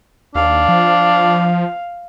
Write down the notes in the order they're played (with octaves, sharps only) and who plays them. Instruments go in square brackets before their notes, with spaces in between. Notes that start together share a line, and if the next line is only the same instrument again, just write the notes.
[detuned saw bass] D#2 [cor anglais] D4 [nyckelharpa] F5
[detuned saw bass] F3